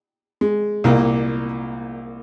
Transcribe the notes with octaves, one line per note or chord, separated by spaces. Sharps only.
G#3
C2 A#2 A#3